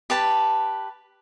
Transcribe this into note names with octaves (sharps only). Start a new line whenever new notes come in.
G4 B4 A5